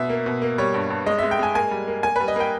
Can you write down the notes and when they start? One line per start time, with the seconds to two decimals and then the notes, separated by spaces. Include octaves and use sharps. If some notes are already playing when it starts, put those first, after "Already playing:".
Already playing: B2 E5
0.09 A#3
0.26 B2
0.42 A#3
0.58 G3 C#5
0.74 G2
0.90 G2
1.06 G#3 D#5
1.19 G#3 E5
1.31 G5
1.39 G#3 G#5
1.55 A#3 G#5
1.71 G3
1.88 A#3
2.03 A#3 G#5
2.16 G3 B4
2.28 D#5
2.36 A#3 G5